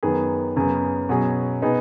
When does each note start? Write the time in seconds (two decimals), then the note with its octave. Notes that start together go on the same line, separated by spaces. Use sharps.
0.03 F#2 D#3 B3 G#4
0.56 F#2 C#3 B3 G#4
1.09 B2 F#3 C#4 G#4
1.62 B2 B3 D#4 G#4